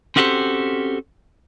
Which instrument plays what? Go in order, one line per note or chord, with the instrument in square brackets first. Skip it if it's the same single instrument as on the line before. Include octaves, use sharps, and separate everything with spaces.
[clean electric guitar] C4 C#4 F#4 G4 A4 C5